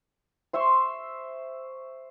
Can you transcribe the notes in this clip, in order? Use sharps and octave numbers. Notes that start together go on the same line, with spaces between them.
C5 E5 C6 C#6